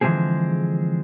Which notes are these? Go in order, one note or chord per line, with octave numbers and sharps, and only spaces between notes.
D3 E3 F3 G#3 C4 G#4